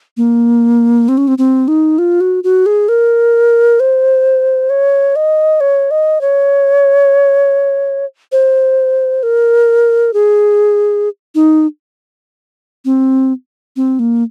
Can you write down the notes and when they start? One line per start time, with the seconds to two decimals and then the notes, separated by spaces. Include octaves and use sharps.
0.17 A#3
1.09 C4
1.18 C#4
1.28 C4
1.38 C4
1.68 D#4
1.98 F4
2.21 F#4
2.44 F#4
2.66 G#4
2.89 A#4
3.80 C5
4.70 C#5
5.16 D#5
5.61 C#5
5.91 D#5
6.21 C#5
8.32 C5
9.23 A#4
10.14 G#4
11.35 D#4
12.85 C4
13.76 C4
13.99 A#3